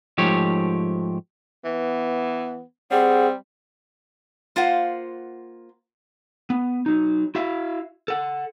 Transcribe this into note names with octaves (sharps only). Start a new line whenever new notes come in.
G#2 F3 A3 G4 C#5
E3 B3
G3 C4 G#4 F#5
A#3 F4 C5 F5 F#5
B3
F#3 D#4
E4 F#4 E5 F5
A4 F#5